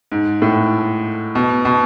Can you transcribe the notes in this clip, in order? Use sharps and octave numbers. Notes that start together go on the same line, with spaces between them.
G#2
A2
B2
B2